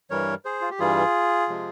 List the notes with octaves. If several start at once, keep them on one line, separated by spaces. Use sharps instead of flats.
G2 E3 G3 A#4 C#5
G#4 C5
F4
G4
G2 E3 G3 F4 G#4
C3 F3 G#3